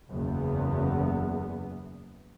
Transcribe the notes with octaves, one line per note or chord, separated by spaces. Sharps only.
F#1 E2 B3